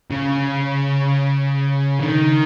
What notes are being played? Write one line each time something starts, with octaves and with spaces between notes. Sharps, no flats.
C#3
D#3